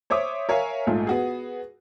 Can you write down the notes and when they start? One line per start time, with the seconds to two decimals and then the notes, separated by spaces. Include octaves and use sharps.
0.10 C5 C#5 E5 D6 D#6
0.49 A#4 C#5 E5 F5 G#5
0.87 A#1 G#2 A3 F4
1.07 B3 F#4 G#4